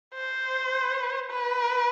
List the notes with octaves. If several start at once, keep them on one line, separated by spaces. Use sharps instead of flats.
C5
B4